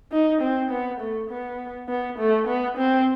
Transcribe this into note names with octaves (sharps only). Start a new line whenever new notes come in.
D#4
C4
B3
A3
B3
B3
A3
B3
C4